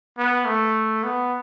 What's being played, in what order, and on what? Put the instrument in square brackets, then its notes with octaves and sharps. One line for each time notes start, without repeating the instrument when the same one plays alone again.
[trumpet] B3
A3
B3